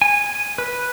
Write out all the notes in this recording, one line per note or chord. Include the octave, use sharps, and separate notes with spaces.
G#5
B4